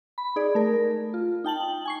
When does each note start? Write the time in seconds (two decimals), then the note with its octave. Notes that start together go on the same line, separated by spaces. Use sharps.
0.18 B5
0.36 D#4 G#4 D5
0.55 A3 A#4
1.14 F4
1.44 D#4 G5 A5 F#7
1.85 G#5 C#6 C7